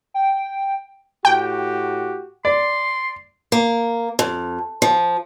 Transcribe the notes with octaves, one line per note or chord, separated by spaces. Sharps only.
G5
A2 F#4 G4 G5
D5 C6
A#3
F2
F3